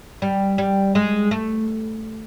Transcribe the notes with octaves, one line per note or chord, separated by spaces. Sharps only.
G3
G3
G#3
A3